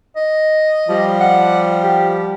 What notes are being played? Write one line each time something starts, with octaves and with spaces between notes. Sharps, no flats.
D#5
F3 G3
F#5
G4